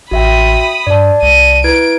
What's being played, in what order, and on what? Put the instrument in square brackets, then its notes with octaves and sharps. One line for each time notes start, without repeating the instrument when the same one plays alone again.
[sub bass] A1 [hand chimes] F#4 E5 G5 [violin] B5 D#6
[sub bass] G2 [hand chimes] D5 A5
[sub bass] C2 [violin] D#7
[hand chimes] E4 B4 G#6 [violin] D7